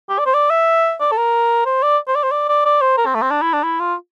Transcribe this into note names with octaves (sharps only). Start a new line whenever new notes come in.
G4
D5
C5
D5
E5
D5
A4
A#4
C5
D5
C5
D5
C5
D5
D5
D5
C5
A#4
C4
A3
C4
D4
E4
D4
E4
F4